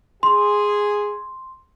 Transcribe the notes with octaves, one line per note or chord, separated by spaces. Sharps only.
G#4 C6